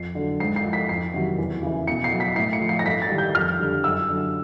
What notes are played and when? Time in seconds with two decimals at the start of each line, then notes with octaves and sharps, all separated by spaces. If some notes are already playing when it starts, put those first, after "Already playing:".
Already playing: F2 C7
0.15 D3 F#3
0.40 G#2 C7
0.56 C7
0.65 F3
0.73 B6
0.89 F2 C7
1.14 C3 D#3 F#3
1.38 E2
1.63 C#3 E3
1.87 B2 C#7
2.04 C7
2.12 F#3
2.20 B6
2.36 A2 C7
2.53 C#7
2.61 F3
2.69 C7
2.79 A#6
2.85 G2 B6
3.02 A6
3.10 D#3 G3
3.18 G6
3.35 F2 F6
3.60 D3 G3
3.84 F#2 E6
4.09 D3 F#3